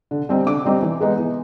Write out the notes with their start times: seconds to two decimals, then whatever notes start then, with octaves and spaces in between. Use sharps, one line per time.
0.11 D3
0.29 G3 C4 D#4
0.47 D3 D6
0.65 G3 C4 D#4
0.82 E3
1.00 G#3 B3 D#4
1.19 E3